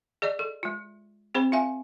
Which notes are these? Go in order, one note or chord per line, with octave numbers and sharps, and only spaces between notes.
G#4 D5 D#5
A4
G#3 F4
C4 G#4 C5 B5
F4 E5 F5 G#5